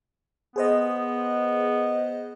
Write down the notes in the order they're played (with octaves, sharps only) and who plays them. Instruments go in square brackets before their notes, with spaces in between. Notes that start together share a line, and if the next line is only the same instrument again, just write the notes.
[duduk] B3 [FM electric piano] G#4 C5 D#5